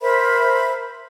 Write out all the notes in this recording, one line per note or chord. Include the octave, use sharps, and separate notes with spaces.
A#4 C5 E5 B5